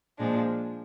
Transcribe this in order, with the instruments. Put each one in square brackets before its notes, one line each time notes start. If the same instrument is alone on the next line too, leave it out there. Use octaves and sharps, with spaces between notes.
[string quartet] A#2 F3 G#3 D4